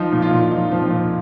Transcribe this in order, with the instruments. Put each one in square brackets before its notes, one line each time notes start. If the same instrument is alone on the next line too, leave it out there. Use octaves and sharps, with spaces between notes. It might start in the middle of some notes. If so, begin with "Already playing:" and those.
Already playing: [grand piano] F3 D#4
A#2
F4
A#2
F3 D#4
F3
C4
A#2